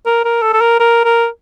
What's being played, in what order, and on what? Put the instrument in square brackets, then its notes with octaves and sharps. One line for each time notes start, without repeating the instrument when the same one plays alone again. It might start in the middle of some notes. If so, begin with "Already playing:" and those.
[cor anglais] A#4
A#4
A4
A4
A#4
A#4
A#4